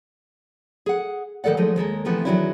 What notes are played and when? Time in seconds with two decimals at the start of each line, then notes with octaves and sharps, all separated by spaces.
0.86 G#4 F#5
1.44 A2 D#3 E3 A4 D5 F#5
1.57 F3 F#3 G#3 A3 D#4 E4
1.76 D#2 G#3 A4 A#4
2.05 C3 E3 F3 A3 B3
2.25 E2 A2 D#3 F#3 D4 E4